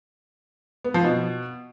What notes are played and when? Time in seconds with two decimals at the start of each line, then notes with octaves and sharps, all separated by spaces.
0.84 B3
0.94 F3
1.04 B2